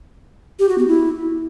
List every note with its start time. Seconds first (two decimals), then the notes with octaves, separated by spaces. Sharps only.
0.59 G4
0.69 F#4
0.78 B3
0.88 E4